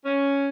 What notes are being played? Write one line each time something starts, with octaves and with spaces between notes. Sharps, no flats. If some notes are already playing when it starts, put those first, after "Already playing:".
C#4